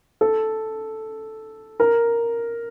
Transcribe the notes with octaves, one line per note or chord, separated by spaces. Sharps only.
A4
A#4